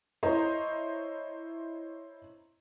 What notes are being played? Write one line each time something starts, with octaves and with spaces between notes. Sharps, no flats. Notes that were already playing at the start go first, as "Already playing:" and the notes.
E4 C5 C#5 D#5 A#5 C6